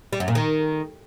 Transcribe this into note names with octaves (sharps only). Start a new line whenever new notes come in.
G3
F#2
A#2
D#3